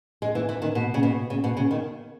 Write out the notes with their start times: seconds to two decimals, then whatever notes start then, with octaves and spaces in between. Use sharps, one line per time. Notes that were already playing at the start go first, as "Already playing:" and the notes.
0.22 G#3
0.35 E3
0.49 E3
0.62 D#3
0.75 B2
0.94 C#3
1.03 B2
1.30 C#3
1.44 B2
1.57 C#3
1.71 D#3